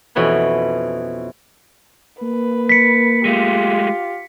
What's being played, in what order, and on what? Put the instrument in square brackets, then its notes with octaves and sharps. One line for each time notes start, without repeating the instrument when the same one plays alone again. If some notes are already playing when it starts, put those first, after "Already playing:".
[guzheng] F2 B2 E3 C#4 B5
[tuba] A#3 [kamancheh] B4
[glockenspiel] B6 C#7
[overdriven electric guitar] G#3 A3 [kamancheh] F4 G4